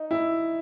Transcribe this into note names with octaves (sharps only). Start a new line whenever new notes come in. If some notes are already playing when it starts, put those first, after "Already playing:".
Already playing: D#4
E4